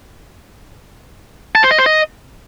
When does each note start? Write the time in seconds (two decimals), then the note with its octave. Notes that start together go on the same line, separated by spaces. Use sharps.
1.55 A5
1.63 C5
1.71 D#5
1.79 C5
1.86 D#5